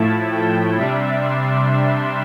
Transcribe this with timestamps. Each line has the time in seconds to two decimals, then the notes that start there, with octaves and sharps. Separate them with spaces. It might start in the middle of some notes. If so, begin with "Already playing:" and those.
Already playing: A2 F3 A3 E4 A5
0.31 G5
0.76 C3 G3 D4 E5
1.21 C6